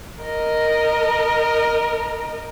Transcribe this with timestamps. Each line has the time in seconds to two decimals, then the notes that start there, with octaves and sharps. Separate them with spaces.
0.24 A#4 D#5